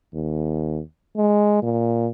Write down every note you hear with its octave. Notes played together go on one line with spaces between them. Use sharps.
D#2
G#3
A#2